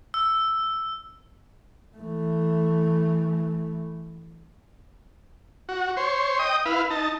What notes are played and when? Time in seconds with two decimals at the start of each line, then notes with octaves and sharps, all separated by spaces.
0.14 E6
1.97 E3 A3
5.69 F#4
5.97 C5 C#5
6.39 D#5 G5 D#6
6.65 E4 B4 F5
6.90 D#4 A5